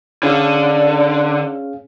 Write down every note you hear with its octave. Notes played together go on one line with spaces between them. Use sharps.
D3 C#4 G#4 F5